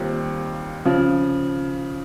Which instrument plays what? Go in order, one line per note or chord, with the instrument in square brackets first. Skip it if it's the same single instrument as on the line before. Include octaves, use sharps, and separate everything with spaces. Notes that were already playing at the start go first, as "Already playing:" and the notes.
Already playing: [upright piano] D#2 D#3 G3 C4 F4
C#3 F3